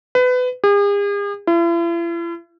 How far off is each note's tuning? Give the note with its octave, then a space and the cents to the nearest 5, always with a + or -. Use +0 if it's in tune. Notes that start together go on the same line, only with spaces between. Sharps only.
B4 +25
G#4 -45
E4 +45